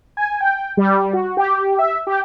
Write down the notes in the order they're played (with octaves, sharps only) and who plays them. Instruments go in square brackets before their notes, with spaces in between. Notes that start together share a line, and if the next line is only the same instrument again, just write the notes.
[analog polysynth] G#5
G5
G3
F#4
G4
E5
G4